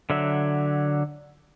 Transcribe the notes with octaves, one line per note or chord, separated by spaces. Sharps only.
D3 F#3 E5